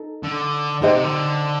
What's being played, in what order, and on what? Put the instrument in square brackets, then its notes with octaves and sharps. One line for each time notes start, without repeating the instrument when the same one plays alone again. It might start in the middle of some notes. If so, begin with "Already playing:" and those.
Already playing: [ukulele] D#4 A4
[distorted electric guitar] D3
[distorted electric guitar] D3 [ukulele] D#4 G4 C5 D#5
[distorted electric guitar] C3
D3